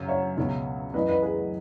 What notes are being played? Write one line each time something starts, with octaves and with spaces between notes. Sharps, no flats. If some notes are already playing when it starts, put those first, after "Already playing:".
Already playing: F#2 C#3 F#3
C#5 E5
C#2 B2 F#3
F#2 E3 B4 D#5
B4 D#5
G#4 B4